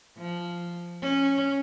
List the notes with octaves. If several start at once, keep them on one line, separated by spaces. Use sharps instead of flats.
F3
C#4